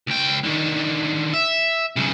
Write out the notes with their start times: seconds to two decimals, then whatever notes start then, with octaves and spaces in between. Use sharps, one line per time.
0.07 C#2 G5
0.43 D3 D#3
1.34 E5
1.96 B1 C#3